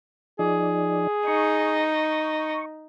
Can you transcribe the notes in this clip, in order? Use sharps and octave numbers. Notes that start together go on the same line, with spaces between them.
F3 D#4 G#4 D5
D#4 C#6